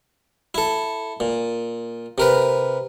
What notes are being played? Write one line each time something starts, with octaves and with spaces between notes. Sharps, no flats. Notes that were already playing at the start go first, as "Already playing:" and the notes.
E4 A4
A#2
C3 A#4 B4